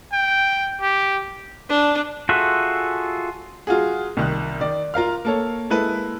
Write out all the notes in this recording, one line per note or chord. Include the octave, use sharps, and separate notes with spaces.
G5
G4
D4
F4 F#4 G#4 A4 E5
F#3 F4 F#4 G#4
C2 D#3 F#6
D#3 D5
F4 A#4 F5 F6
A#3 A4 C#5
G#3 A#3 E4 A4 B4